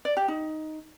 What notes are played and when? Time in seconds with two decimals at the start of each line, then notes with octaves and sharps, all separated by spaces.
0.05 D5
0.17 G4
0.28 D#4